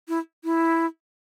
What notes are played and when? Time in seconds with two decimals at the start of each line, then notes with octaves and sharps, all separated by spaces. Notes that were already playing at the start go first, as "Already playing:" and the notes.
0.08 E4
0.44 E4